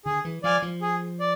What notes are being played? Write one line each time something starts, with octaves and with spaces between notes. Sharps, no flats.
D3 G#4
E3
F3 D5 F5 G#5
F3
G#4
D5